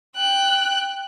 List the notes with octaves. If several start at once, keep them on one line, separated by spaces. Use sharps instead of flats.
G5 F#6